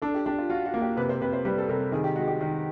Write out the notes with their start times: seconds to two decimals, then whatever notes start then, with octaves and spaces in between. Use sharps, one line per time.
0.02 D4 A4
0.14 G4
0.26 D4 G4
0.38 F4
0.50 F4 F#4
0.66 F#4
0.74 A#3
0.81 G4
0.97 C3 B4
1.09 C5
1.21 C3 B4
1.33 C5
1.45 G3 B4
1.58 A4
1.69 C3 A#4
1.92 D#3 G#4
2.04 G4
2.16 G#3 F#4
2.28 G4
2.41 D#3